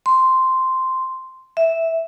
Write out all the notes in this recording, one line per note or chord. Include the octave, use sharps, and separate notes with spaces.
C6
E5